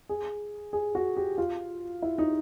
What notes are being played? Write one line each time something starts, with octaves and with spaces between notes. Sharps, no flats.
G#4
G#4
F#4
G4
F4
E4
D#4